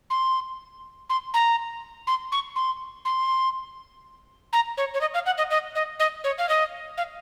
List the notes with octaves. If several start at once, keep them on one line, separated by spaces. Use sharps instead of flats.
C6
C6
A#5
C6
C#6
C6
C6
A#5
C#5
C#5
D#5
F5
F#5
D#5
D#5
D#5
D#5
C#5
F5
D#5
F5